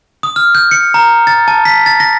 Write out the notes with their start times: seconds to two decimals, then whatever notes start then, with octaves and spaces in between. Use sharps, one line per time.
0.23 D#6
0.36 F6
0.55 G6
0.71 C#7
0.94 A#5
1.27 A6
1.48 A5
1.65 B6
1.86 A6
2.00 A#6